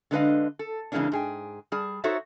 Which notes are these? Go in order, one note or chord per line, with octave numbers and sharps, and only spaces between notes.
D3 G#3 D4 B4 D#5 F5
A4
C#3 E3 G#3 A#3 C#4 D4
G#2 G#4 G5
G3 G#4 A5
D#4 F#4 A4 C5 C#5 E5